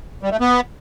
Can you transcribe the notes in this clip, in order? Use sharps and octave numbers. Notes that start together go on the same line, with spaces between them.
G3
A3
B3